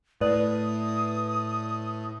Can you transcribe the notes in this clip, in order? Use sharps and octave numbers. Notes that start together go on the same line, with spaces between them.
A2 B4 D5 D#6